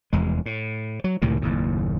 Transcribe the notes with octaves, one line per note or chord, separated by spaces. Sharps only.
F1 E2 G#3
A2
F#3
C#2 A2 C3 D#3
F#1 D#2 A2